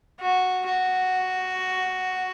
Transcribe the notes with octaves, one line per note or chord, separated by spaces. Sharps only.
F#4
F#4